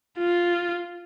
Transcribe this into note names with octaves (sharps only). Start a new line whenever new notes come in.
F4